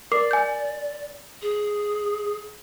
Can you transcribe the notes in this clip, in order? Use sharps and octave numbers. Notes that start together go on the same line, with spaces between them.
A#4 D5 D6 C7
G#5 G6
G#4